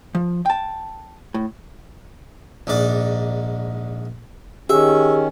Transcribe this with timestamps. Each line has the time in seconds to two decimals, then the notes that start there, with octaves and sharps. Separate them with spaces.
0.15 F3
0.46 G5 A5
1.34 A2
2.67 A#1 G#2 D5
4.69 D#3 C#4 G4 G#4 E5